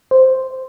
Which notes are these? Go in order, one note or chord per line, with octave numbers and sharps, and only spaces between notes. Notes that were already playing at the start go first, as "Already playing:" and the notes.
C5